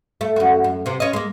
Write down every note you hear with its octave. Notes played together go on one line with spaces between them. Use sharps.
A3
F#2 F#4
F#2
C3 C4
C#4 D#5
G#3 A#3